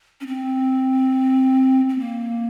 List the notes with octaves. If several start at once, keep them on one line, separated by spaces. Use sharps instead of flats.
C#4
C4
C4
A#3